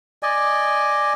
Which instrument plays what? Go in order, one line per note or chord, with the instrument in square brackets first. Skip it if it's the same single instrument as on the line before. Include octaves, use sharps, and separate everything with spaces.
[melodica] D5 D#5 G#5